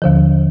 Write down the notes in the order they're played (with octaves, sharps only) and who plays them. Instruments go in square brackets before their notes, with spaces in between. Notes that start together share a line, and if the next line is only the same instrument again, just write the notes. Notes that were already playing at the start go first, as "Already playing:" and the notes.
[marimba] D#2 D3 F3